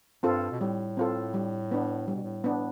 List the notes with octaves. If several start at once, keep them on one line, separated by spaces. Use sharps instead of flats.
G2 C4 F4 A4
B2
A2 G3
C4 F4 A4
G3
B3 D4
A2 G3
B2
A2
B3 D4